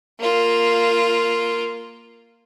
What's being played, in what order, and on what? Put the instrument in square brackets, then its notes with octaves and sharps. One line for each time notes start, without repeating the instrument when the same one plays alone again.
[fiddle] A#3 F4